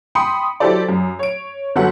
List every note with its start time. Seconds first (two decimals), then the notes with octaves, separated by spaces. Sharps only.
0.15 G5 B5 C6 D#6 C#7
0.60 F#3 E4 G4 A4 C5 D5
0.89 F#2
1.19 C#5 D7
1.76 G1 F#3 A4 F#5